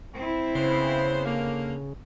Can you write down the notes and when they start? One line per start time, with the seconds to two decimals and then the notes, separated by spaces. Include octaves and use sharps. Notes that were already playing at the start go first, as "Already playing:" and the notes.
0.16 C4 E4
0.55 C#3 B3 C5
1.25 D3 A#3